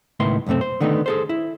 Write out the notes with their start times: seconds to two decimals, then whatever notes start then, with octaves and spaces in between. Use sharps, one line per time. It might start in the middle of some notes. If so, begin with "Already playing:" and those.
0.20 C#2 A2 D#3 B3 E4 C6
0.46 B1 F#2 C3 A3 C4
0.61 C5
0.80 D3 D#3 A3 B3 D#4
1.06 G#4 A4 C5
1.29 E4